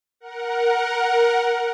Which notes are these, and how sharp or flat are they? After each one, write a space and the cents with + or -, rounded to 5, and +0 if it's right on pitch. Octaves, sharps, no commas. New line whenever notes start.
A#4 +10 F#5 +0